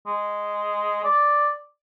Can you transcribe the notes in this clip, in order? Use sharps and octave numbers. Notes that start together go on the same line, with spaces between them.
G#3
D5